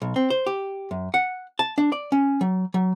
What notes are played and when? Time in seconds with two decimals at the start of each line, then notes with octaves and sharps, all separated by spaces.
0.02 B1
0.16 C4
0.30 C5
0.46 G4
0.91 F#2
1.14 F#5
1.59 A5
1.78 D4
1.92 D5
2.12 C#4
2.41 F#3
2.74 F#3